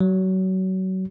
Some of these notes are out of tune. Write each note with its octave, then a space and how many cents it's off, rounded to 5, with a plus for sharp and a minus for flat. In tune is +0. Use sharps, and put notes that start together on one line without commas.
F#3 +25